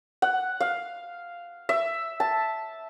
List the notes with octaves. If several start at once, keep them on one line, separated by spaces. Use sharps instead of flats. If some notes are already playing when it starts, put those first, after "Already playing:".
F#5
F5
E5
A5